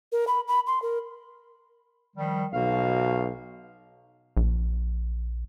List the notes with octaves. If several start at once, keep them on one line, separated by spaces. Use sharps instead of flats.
A#4
B5
B5
C6
A#4
D#3 F3 G3
B1 B2 F#4 F5
A#1